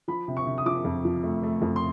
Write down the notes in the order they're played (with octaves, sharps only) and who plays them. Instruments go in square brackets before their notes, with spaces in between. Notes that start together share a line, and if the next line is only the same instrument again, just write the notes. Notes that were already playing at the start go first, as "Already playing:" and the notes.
[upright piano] F3 B5
C3
C#6
C3
D#6
F3 D6
F2
F3
A3
A3
F2
C6